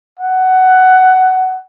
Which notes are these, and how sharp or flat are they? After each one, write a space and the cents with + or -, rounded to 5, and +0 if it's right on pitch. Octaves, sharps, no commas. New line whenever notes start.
F#5 +15